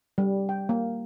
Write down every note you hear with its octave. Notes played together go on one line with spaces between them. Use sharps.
G3
G5
A#3